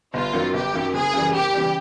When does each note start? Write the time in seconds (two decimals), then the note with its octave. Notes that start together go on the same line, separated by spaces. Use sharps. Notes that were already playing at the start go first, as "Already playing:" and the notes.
0.13 G1 F4
0.33 F#2 D#3 F#3
0.53 G1 G4
0.73 F#2 D#3 F#3
0.94 F#1 G#4
1.13 F#2 C#3 E3 G3
1.34 F#1 G4
1.54 C#3 E3 G3